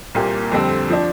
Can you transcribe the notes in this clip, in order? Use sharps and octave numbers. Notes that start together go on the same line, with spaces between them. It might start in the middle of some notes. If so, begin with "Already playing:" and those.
C2 A#2 A#3 G4
F2 D3 G3 C4
F3 D4